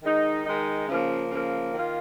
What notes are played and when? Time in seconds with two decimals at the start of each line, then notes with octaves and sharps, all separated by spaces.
0.03 D#3 G#3 D#4
0.45 D#3 G#3 D#4
0.89 C#3 F3 A#3
1.31 C#3 F3 A#3
1.74 D#3 A#3 F4